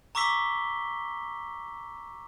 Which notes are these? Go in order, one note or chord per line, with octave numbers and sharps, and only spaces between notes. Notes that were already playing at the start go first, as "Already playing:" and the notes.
A#5 C#6 D6 E6 B6 G7